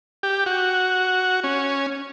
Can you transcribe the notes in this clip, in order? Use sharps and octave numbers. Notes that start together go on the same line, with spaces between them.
G4
F#4
C#4